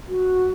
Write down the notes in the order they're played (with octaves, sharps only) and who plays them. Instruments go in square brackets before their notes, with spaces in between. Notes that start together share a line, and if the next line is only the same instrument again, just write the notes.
[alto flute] F#4